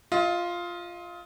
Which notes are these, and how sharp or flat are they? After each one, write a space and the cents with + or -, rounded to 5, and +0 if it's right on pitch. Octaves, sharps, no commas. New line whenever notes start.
F4 +0 D#5 +35